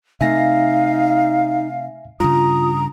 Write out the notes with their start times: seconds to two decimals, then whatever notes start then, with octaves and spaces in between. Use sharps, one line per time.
0.21 C3 A3 D#4 E5 F5 G#5 A#6
2.20 G2 C#3 F4 A#5 D#6